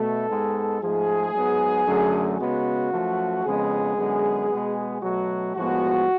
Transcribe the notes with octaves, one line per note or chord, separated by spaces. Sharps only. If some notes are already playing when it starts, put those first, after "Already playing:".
Already playing: B2 A3 A4
G#2 G#3 B3
G#2 F3 A3 G#4
G#2 F#3 B3
F#2 D3 F#3 A3
C#3 G#3 B3 F#4
F#2 F3 A3
F2 C#3 G#3 B3 G#4
F#2 D3 G#3 B3
B2 G#3 B3
B2 F#3 A3 F#4
A2 F3 G#3 B3 F#4